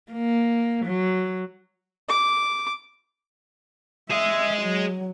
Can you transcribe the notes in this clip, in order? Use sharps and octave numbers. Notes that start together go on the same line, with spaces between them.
A#3
F#3
D6
G#4 D#5 E5
F#3